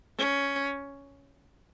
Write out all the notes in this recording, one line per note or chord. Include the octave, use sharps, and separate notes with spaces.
C#4